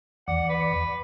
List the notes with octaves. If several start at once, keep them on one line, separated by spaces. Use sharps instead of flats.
E2 D5 F#5
B4